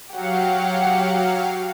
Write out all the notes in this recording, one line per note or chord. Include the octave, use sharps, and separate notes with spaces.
F#3 G4 F5 F#5